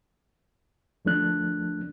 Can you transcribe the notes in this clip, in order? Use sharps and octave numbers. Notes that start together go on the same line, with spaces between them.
D2 F3 A3 D4 F#6